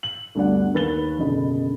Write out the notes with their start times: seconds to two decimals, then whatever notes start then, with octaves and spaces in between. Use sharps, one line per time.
0.03 F#7
0.35 D2 G2 B3 D5 F#5
0.74 D#2 B4 A6 G7
1.18 F#1 B2 D3 D#5 B5